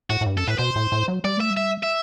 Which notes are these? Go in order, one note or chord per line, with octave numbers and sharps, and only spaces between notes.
A2 F#4
A2
G2
F#2 A4
A2 B4
B2 C5
A2
A2
F#3
G3 D5
A3 E5
G3
E5
E5